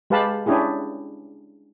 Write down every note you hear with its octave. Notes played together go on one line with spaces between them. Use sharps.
G#3 G4 B4 F5 A5 B5
C#4 D4 E4 G4 G#4